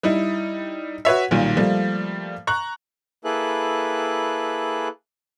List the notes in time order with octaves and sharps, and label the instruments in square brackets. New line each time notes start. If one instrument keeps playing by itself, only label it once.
[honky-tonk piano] G3 D#4 E4
F#4 B4 C#5 E5
B1 A#2 D#3 G3
F3 G3 A3 A#3
A#5 C#6 F#6
[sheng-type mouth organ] A#3 E4 G#4 A4 B4 F#6